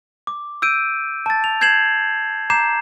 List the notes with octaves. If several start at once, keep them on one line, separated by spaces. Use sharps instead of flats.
D6
E6 G6 D7 D#7
A5 A6
F7
G6 G#6 C7 E7 F#7
A#5 D6 G6 C7 E7